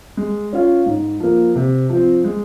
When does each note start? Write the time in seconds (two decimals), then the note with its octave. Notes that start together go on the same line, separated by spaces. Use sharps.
0.17 G#3
0.53 C#4 F4
0.86 G#2
1.20 F3 A#3
1.56 C3
1.90 F3 C4
2.24 G#3